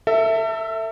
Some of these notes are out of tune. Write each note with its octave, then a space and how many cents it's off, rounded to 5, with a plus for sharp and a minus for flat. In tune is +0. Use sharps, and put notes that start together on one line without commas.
A4 +35 E5 +0